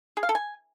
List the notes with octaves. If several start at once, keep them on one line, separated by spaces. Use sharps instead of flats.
G#4
F5
A4
G#5